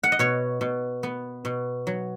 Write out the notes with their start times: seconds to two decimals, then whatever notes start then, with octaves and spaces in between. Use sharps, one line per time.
0.03 F#5
0.12 D#5
0.19 B2 C#5
0.61 B2
1.03 B3
1.45 B2
1.87 F#3